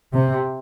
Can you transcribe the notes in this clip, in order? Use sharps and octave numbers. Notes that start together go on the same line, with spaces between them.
C3